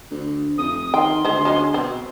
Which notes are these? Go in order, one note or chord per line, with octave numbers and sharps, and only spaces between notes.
D2
F1 D#6
D#3 G5 C6
D2 G#3 C5
F#3 G#3 C#4
B2 C4